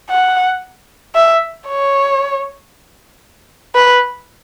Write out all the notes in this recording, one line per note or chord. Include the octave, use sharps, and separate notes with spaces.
F#5
E5
C#5
B4